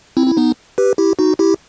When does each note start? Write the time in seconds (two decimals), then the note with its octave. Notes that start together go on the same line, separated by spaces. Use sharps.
0.17 C4 E4
0.27 E4
0.37 B3 D#4
0.78 G4 B4
0.98 E4 G4
1.19 D#4 F#4
1.39 E4 G4